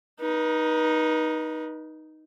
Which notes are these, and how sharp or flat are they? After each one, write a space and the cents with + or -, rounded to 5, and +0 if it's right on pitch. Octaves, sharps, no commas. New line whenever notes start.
D#4 +0 B4 -40